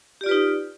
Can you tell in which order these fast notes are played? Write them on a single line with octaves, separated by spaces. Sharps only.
G4 D5 F4 B4 D#4